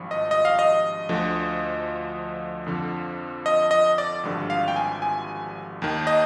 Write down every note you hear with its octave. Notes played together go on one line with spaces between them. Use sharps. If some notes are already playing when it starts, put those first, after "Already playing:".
Already playing: G#1 G2 F3
D#5
D#5
F5
D#5
D2 D3 F3
F2 D3 F3
D#5
D#5
D5
G#1 G2 D3 F3
F5
G5
G#5
G#5
D#2 D#3
D#5